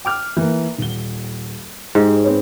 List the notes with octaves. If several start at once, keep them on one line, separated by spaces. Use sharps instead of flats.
G5 D6 F6
E3 A#3
D#1 G7
G#2 G4 C5
C4 B4 C#5